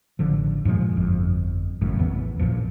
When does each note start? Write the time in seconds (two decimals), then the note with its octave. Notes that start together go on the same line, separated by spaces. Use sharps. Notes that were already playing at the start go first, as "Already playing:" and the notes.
0.19 A1 D3 F3
0.65 G2 A#2 F3 G#3
0.96 G1 F2
1.81 G#1 F#2 A2 C#3
1.99 A1 E2 E3 B3
2.39 A#1 F#2 A#2 F3